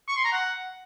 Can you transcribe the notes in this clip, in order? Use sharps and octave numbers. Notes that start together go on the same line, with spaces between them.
C#6
C6
A#5
F#5